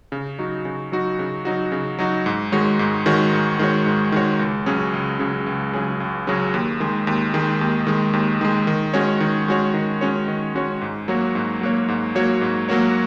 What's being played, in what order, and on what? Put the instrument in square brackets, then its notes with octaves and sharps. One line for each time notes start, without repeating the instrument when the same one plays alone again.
[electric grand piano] C#3
F#3 D#4 F#4
C#3
F#3 D#4 F#4
C#3
F#3 D#4 F#4
C#3
F#3 D#4 F#4
G#2
D#3 G#3 F#4 C#5
G#2
D#3 G#3 F#4 C#5
G#2
D#3 G#3 F#4 C#5
G#2
D#3 G#3 F#4 C#5
C#2
C#3 F#3 C#4 G#4
C#2
C#3 F#3 C#4 G#4
C#2
C#3 F#3 C#4 G#4
C#2
C#3 F#3 C#4 G#4
D#2
D#3 G#3
D#2
D#3 G#3
D#2
D#3 G#3
D#2
D#3 G#3
D#3
G#3 C#4 F#4 C#5
D#3
G#3 C#4 F#4 C#5
D#3
G#3 C#4 F#4 C#5
D#3
G#3 C#4 F#4 C#5
G#2
F#3 A#3 F#4 C#5
G#2
F#3 A#3 F#4 C#5
G#2
F#3 A#3 F#4 C#5
G#2
F#3 A#3 F#4 C#5